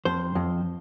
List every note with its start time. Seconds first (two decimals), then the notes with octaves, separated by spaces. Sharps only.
0.05 F2 C5
0.35 F2